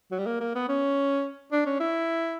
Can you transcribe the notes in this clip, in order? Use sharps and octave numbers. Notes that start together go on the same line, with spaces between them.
F#3
G3
A#3
A#3
B3
C#4
D4
C#4
E4